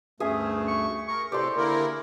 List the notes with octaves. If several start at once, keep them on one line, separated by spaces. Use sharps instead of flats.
D2 G2 A3 C#4 G#4 E5 D#6
C#6
A#4 C#6
A2 C3 G4 A4 C5 D5 C6
D3 A#3 E4 A#4